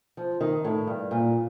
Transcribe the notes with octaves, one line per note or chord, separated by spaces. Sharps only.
F3
D#3
A2
G2
A#2